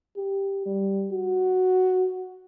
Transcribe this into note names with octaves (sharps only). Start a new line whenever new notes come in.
G4
G3
F#4